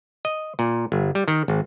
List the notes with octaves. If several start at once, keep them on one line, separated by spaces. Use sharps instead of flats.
D#5
A#2
G1
G3
D#3
G#1